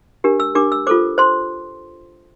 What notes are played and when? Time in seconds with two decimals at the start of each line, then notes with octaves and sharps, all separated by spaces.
0.24 D4 G4 A#4
0.40 E6
0.55 D4 G4 A#4 D6
0.72 E6
0.87 F4 A4 C5 D6
1.18 C5 C6